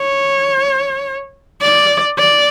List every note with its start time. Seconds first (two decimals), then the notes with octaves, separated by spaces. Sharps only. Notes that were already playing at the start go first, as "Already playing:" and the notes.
Already playing: C#5
1.62 D5
2.18 D5